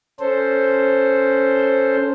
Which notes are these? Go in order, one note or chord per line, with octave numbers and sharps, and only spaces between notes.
C#4 A4 C5